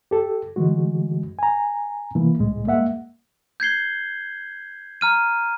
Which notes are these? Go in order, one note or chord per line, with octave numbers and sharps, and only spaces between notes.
G4 A4
D3 E3 G#3 F#4
G#5 A#5
C3 E3 A#3 E4
C#2 A2 G#3
G#3 A#3 E5 F#5
G6 G#6 C7 G7
A#5 F6 D#7